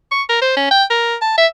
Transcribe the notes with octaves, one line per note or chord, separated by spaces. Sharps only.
C#6
A#4
C5
C#4
G5
A#4
A5
E5